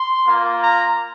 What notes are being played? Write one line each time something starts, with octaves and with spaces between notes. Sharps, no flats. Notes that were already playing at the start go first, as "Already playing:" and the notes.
Already playing: C6
A#3 F4
A#5